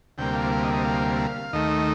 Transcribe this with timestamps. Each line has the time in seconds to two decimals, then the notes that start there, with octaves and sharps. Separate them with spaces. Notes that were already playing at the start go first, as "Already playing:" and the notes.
0.18 D2 C3 G3 A#3 G5
0.35 F5
0.52 F5
0.63 D#5
0.74 D#5
0.85 F5
1.53 D#2 D#3 A3 D#5